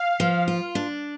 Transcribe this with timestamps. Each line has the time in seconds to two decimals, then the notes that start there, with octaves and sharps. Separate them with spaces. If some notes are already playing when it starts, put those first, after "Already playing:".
Already playing: F5
0.20 F3
0.48 F4
0.75 D4